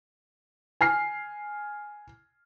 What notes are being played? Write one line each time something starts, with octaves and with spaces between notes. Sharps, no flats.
G#5 F6 C7